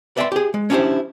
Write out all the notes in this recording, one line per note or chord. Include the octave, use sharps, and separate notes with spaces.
B4 D5 E5 F5 G5 C6
G4 G#4
G#3
C#4 D4 E4 F#4 G4 C5